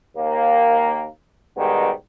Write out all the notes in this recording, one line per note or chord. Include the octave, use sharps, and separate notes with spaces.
D#2 A#3
G#2 B2 D#3 G3